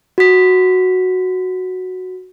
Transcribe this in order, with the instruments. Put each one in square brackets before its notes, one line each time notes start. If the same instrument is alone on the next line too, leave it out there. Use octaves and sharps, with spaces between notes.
[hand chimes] F#4 B6